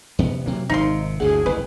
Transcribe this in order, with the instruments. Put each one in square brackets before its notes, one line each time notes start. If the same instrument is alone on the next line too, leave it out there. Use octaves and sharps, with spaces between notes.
[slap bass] E2 C3 B3
C3 F#3 A#3
[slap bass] G#1 C3 [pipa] D#4 F5 C6
[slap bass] G1 D2 A2 [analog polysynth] G#4 [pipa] F#5
[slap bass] F#1 C2 [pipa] B4